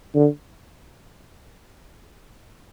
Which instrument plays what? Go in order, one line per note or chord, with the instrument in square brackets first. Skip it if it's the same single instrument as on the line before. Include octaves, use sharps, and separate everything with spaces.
[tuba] D3